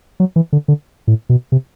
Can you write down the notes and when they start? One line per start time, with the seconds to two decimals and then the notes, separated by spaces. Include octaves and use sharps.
0.20 F#3
0.36 E3
0.53 D3
0.68 D3
1.07 A2
1.29 B2
1.52 C3